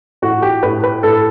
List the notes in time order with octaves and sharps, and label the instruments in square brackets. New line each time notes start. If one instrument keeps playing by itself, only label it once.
[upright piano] A2 F#4
G4
A2 B4
B4
A2 A4